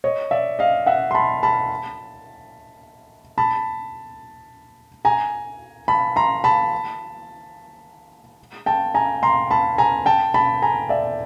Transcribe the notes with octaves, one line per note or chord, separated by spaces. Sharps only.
C#5 D#5
D5 E5
D#5 F5
E5 F#5
C6
A5 B5
A5 B5
A5 B5
G#5 A#5
A5 B5
A#5 C6
A5 B5
G5 A5
G#5 A#5
A#5 C6
A5 B5
G#5 A#5
G5 A5
A5 B5
G#5 A#5
D5 E5